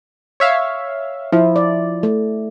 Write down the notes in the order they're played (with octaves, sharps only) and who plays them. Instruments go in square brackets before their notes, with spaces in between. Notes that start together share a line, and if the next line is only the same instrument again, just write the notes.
[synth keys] C#5 E5 F5
[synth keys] F3 [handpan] E4
[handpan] D5
A3